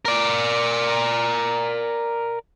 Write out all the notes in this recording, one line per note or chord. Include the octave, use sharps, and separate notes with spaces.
A#4 D5